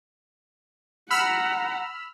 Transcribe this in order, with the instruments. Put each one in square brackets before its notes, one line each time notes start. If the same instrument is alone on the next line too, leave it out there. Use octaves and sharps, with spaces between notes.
[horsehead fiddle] F#5 A#5 [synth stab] B5 E6 F6